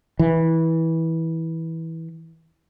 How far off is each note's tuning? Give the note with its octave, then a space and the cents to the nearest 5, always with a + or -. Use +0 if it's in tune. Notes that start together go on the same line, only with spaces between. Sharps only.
E3 -20